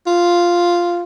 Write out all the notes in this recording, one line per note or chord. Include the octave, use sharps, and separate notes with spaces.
F4